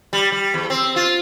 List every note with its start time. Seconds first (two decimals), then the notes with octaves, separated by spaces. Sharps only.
0.13 G3
0.32 G3
0.54 E2
0.70 C4
0.96 F4